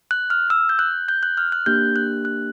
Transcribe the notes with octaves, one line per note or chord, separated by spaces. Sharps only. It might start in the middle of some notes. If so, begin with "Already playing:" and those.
F#6
F6
E6
G6
F#6
G6
F#6
F6
F#6
A#3 D4 G4 G6
F#6
F#6